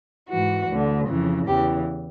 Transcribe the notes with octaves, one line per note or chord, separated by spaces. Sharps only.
G#2 E3 F#4
D2 D3
F2 C#3 E3
E2 C#3 E3 G4